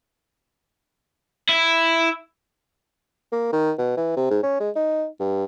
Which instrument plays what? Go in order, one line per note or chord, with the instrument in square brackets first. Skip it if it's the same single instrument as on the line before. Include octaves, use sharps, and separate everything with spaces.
[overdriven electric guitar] E4
[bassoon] A#3
D#3
B2
E3
C3
G#2
C#4
G#3
D#4
G2